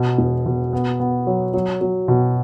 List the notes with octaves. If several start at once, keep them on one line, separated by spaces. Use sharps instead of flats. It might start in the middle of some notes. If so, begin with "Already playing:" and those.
Already playing: B2
E1
B2
B3
B3
F#3
F#3
F#3
B2